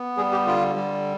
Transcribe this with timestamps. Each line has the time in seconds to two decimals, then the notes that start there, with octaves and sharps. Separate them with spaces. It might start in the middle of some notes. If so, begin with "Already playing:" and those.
Already playing: B3
0.17 G3 G#4
0.32 G4
0.46 D3 F4
0.75 G3